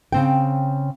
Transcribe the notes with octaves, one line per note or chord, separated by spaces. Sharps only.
C#3 C4 G5